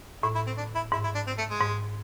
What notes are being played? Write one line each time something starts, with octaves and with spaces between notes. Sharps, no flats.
A2 E4
E4
C4
D4
E4
G#2 E4
E4
D4
C4
A3
G#3
G#2